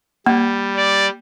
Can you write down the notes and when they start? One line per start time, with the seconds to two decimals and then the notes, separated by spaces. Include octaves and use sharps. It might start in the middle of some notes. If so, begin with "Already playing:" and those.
0.26 G3 A#3
0.77 D5